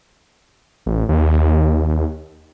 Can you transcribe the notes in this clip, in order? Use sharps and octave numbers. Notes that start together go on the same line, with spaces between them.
A1
D#2